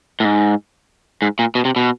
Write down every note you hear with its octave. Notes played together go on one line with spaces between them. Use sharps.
A2
G#2
G#2
A#2
B2
C3
B2